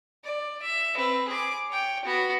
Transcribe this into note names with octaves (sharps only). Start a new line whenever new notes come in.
D5
E5
C4 B4
G#4 D6
C#5 G5
B3 F#4